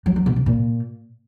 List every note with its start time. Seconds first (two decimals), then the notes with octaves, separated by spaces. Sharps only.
0.06 F#3
0.16 F#3
0.26 B2
0.36 C3
0.46 A#2